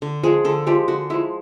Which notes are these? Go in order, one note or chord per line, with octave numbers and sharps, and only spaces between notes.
D3
F3 G#3 G#4
D3 A4
F3 G#3 G4
D3 F#4
F3 G#3 E4